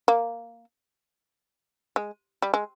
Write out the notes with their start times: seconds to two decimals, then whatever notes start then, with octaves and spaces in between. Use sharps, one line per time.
0.08 A#3
1.96 G#3
2.42 G3
2.54 G#3